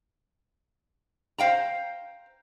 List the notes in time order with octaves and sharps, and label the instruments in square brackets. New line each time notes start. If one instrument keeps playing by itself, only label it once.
[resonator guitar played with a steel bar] C5 F5 G5 A#5